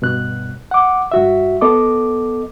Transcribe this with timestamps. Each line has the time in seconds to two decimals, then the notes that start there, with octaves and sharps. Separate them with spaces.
0.02 G2 B2 F#6
0.71 F#5 D6
1.12 G2 F#4 E5
1.61 B3 A4 D#5 D6